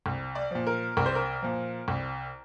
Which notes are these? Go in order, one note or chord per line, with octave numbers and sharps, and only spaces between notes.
C2
D5
A#2 F3
A#4
C2 A#4
C5
A#4
A#2 F3
C2